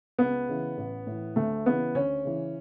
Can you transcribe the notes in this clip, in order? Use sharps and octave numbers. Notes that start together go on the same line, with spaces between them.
C#2 B3
C#3 E3
A1
A2 E3
D2 A3
C#3 E3 B3
D2 C#4
C#3 E3